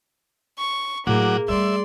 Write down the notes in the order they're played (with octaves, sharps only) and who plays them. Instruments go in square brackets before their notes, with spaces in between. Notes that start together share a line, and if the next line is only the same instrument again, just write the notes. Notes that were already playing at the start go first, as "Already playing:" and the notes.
[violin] C#6
[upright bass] A2 [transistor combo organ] F#3 F#5 D6 [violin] A#3 [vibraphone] G#4
[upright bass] G3 A3 [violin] D5 C6 [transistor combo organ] E5